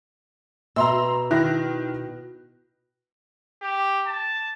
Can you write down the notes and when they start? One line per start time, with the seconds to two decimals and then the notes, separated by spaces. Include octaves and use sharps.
0.76 B2 E5 A#5 C6 E6
1.31 D#3 E4 F#6 A#6
3.62 G4
4.07 A5